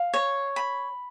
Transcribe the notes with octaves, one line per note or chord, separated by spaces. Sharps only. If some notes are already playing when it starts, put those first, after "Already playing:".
Already playing: F5
C#5
B5